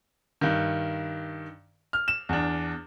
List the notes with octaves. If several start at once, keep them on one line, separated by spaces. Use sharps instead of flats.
G2 D#3
F6
E7
E2 D4